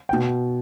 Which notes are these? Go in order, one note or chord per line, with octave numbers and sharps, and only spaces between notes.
G5
B2